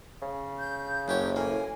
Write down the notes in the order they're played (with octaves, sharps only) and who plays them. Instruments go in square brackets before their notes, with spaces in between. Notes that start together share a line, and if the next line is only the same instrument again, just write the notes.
[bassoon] C#3
[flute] G6
[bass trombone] F#1 [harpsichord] F#2 G4 C#5
[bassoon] A2 [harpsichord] A#3 [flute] G#5